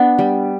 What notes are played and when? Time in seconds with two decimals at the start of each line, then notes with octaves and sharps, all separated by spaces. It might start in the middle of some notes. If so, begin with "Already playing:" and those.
Already playing: B3 D4
0.19 G3